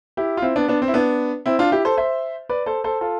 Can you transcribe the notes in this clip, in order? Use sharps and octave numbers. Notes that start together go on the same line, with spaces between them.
E4 G4
F4
C4 E4
B3 D4
B3 D4
C4
E4
B3 D4
C4 E4
D4 F4
E4 G4
A4 C5
C5 E5
B4 D5
A4 C5
A4 C5
F4 A4